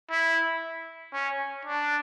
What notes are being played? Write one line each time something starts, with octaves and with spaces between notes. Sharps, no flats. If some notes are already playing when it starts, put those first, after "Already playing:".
E4
C#4
D4